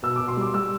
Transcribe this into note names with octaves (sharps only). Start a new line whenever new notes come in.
B2 E6
B2 D6
C6
G3 D6
G3 E6